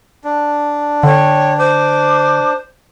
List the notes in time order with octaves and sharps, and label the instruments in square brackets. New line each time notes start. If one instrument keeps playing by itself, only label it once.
[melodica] D4
[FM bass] D3 [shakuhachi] C#5 [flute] G5
[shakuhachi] C5 [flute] D6